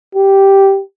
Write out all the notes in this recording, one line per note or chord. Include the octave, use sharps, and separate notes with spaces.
G4